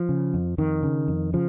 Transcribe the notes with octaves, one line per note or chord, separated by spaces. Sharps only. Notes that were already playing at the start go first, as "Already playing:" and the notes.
Already playing: F3
C#3
F2
F2 D#3
C#3
F2
C#3 F3